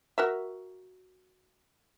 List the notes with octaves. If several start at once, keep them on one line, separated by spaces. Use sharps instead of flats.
F#4 A#4 E5